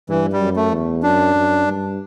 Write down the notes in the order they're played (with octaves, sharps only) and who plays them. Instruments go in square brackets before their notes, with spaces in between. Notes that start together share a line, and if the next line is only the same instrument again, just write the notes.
[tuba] G2 [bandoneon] E3
[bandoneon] G3
[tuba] F#2
[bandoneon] A3
[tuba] E2
[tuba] F#2 [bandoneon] D4
[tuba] F#2
G2